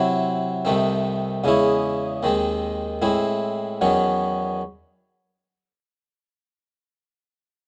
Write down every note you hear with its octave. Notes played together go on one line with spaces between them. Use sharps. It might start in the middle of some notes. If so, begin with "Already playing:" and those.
Already playing: C3 F#3 C4 E4
C2 C3 D#3 A3 C4
E2 C#3 G#3 C#4 E4
D#2 D#3 G#3 C4
A2 G#3 C4 E4
E2 D#3 F#3 C#4